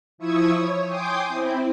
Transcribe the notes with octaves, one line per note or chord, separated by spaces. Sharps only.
F3 E4 C#6 D#6 E6 G#6
C#5
G5 G#5 C6 D6 D#6 G6
C4 E4